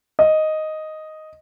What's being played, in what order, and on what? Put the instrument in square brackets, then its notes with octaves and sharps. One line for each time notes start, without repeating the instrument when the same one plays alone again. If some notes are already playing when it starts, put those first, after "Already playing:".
[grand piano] D#5